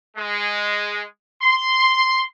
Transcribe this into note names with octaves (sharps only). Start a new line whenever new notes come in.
G#3
C6